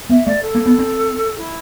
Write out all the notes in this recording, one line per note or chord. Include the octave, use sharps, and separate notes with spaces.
B3 E5
A3 D5
A4
A#3
B3
C4
E4